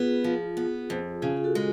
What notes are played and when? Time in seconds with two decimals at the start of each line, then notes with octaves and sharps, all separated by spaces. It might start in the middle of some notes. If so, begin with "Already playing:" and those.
Already playing: B3 F4 G#4
0.24 F3
0.57 B3
0.90 F2
1.22 C#3 F4 G#4
1.36 G#4
1.44 F#4 A4
1.55 G#3